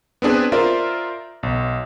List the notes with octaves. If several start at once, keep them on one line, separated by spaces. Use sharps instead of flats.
B3 C4 D4 G#4 B4
F4 A#4 C5 D5 E5
B1